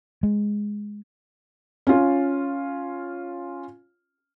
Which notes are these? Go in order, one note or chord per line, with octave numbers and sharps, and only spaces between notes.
G#3
C#4 F4